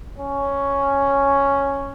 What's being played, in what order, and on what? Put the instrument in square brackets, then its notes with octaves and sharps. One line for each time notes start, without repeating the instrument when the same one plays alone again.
[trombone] C#4